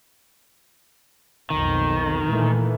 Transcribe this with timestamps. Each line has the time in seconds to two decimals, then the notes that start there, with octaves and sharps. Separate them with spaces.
1.50 B1 F2 D#3
2.26 A#2 E3 A3